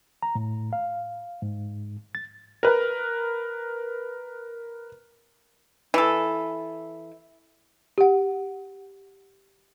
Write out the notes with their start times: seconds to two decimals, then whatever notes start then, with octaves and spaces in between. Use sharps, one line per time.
0.23 A#5
0.35 A2
0.73 F5
1.42 G#2
2.15 A6
2.63 A#4 B4
5.94 E3 A4
7.98 G4 F#5